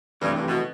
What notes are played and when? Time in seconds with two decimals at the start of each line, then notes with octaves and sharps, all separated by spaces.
0.22 G2 C3 E3 A3
0.35 G2
0.48 B2